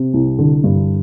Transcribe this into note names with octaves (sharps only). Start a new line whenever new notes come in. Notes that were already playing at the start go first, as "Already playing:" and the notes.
Already playing: C3
C2
D3
G2